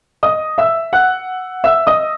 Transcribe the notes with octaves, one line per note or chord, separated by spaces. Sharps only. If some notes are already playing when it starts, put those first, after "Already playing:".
D#5 D#6
E5 E6
F#5 F#6
E5 E6
D#5 D#6